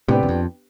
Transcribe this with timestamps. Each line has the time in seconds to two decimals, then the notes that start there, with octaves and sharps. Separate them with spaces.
0.08 A2 C3 B3 D4 G4 B4 D5
0.23 E2
0.29 F2